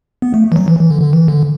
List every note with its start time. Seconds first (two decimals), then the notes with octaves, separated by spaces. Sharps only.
0.22 B3
0.34 A3
0.52 E3
0.56 F#3
0.68 E3
0.79 E3
0.90 D3
1.02 D3
1.13 E3
1.28 D3